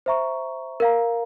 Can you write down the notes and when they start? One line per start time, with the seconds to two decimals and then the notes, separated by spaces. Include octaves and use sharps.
0.06 C5 E5 A#5 C#6
0.80 A#4 F5 A#5